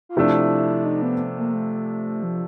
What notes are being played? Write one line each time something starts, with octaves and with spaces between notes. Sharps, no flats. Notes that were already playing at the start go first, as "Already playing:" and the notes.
F4
C3 F3 A3 D4 E4
D#4
B3
A#3
A3
F3